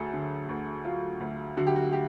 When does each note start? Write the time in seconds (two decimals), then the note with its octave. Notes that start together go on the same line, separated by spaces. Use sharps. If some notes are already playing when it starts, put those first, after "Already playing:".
Already playing: D2 F#3 G#4 A4
0.13 D3
0.49 D2 F#4
0.85 F#3 F4
1.20 D2
1.57 D3 F#4
1.67 G4
1.76 F#4
1.92 G4